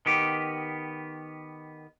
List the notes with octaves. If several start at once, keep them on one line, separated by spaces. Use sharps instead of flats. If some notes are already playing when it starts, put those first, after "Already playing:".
D#3 B3 G4